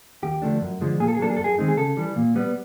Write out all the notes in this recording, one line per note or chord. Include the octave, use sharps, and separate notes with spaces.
D#2 G4
D3 F3 A3 D4
F#2
D3 F3 G#3
A#2 G#4
A4
G#4
F#3 A#3 D4 A4
G#4
F#2 A4
G#4
D#3 G#3 C4 D#4
G#4
C#3 A4
E3 G3
A#2
G3 B3